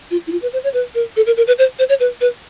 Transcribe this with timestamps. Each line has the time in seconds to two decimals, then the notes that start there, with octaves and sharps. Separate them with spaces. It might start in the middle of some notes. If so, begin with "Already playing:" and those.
0.11 F4
0.27 E4
0.32 F4
0.42 B4
0.53 C5
0.64 C#5
0.74 B4
0.95 A#4
1.16 A4
1.26 A#4
1.37 A#4
1.47 B4
1.59 C5
1.79 C5
1.89 C#5
2.00 B4
2.21 B4